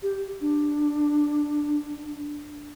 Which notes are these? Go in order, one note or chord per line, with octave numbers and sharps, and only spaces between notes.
G4
D4